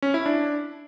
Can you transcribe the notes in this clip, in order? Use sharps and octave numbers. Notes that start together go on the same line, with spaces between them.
C#4
E4
D4